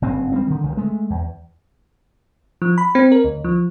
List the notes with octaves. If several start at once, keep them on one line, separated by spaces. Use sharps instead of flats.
F#1 G2 C4
G3 A#3 C4
D3 D#3
C#2 D#3
G#3 A3
E2
F3
B5
C4
A#4
D2
F3